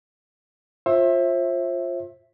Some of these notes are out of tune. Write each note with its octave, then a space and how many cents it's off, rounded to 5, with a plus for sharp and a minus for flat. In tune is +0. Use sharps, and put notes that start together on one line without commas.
F4 +15 C5 +35 E5 +0